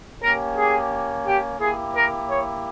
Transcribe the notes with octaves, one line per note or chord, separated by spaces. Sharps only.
A#3 C#4 G4 A#4
G#4
G4
A#3 E4 G4 G#4
A#4
C#5